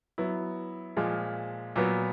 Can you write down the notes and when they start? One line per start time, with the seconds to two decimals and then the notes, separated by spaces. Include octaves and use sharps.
0.18 F#3 B3 E4
0.97 A#2 F3 G#3
1.76 A#2 F#3 B3